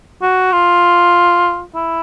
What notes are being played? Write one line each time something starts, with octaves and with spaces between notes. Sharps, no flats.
F#4
F4
E4